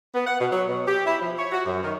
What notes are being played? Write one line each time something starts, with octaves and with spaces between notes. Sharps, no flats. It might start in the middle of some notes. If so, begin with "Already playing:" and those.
B3
F#5
B2
F#3
B2
G4
E4
F3
C#5
F#4
F#2
D#3